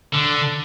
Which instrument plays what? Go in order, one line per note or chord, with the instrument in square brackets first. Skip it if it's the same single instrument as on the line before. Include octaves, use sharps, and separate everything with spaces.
[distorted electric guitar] D3